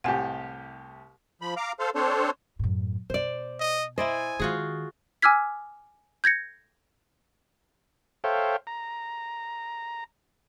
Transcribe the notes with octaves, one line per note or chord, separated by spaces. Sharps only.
C2 A2 G4 F#5 G#5
F3 B5
F5 A#5 D6
A4 C5 F5
C4 D4 A4 C5 C#5
F#2 A2
B2 C5 D5
D#5
E4 C5 D5 D#5 G#5
D#3 G#3 F4 F#4 G#4
G#5 D6 E6 F6 G#6 B6
G6 G#6 A#6 C#7
A4 C5 C#5 E5 F5 G5
A#5